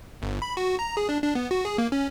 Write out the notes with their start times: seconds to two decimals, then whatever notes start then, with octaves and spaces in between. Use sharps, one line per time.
0.22 G1
0.42 B5
0.57 F#4
0.79 A#5
0.97 G#4
1.09 D4
1.23 D4
1.35 B3
1.51 F#4
1.65 G#4
1.78 A#3
1.92 C#4